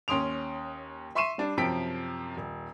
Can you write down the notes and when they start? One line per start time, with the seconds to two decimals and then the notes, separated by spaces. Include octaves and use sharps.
0.08 D#2 C#4 C6 D#6 D7 F7
1.15 E5 C6 C#6 C7 D#7 E7
1.38 G3 D4
1.57 F#2 C3 F3 G5 B6 D7
2.37 D#1